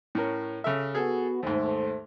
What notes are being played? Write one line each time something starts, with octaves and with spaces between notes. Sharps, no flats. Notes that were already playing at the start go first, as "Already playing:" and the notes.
A2 C#4 A#4
C#3 A4 E5
B3 F#4 G#4 A4
D#2 G#2 A3 C5